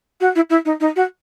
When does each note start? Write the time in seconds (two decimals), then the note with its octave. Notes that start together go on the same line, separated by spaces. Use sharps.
0.20 F#4
0.35 E4
0.49 E4
0.65 D#4
0.80 D#4
0.95 F#4